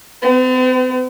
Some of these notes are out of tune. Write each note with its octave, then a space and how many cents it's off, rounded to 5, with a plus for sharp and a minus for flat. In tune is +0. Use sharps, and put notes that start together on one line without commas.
C4 -45